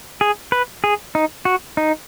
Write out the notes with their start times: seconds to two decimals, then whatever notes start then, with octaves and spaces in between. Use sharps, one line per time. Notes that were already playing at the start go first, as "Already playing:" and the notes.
0.21 G#4
0.52 B4
0.84 G#4
1.15 D#4
1.45 F#4
1.77 D#4